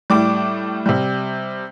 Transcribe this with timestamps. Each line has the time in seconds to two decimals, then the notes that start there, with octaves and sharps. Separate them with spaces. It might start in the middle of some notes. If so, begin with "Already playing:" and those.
0.10 A2 G3 D6
0.86 C3 G3